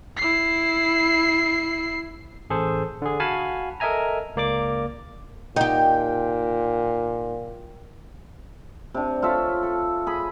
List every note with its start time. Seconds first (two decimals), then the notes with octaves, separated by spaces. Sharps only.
0.17 E4 C7
2.50 A1 G#4 A4 C5
3.02 D3 G#4
3.20 F#4 F5 F#5 G#5 A5 B5
3.80 A4 A#4 D#5 E5 G#5 A#5
4.36 C#2 A#3 D5 D6
5.56 A#2 D#4 G4 G5
8.94 C3 D4
9.22 F4 A4 C#5 E5
9.63 A4
10.07 G#4 B5